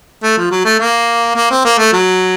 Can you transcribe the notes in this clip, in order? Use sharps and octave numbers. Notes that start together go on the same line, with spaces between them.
A3
F3
F#3
A3
A#3
A#3
C4
A#3
A3
F#3